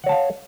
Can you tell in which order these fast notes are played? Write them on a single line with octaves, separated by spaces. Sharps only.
F#5 C#5 A5 F5